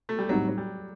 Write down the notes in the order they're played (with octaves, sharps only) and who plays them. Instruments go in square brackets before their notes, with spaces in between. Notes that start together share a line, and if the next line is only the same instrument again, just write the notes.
[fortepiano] A3
G3
[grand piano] A2 G3 C4 D#4 [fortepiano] F#3
[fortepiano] F#3
G3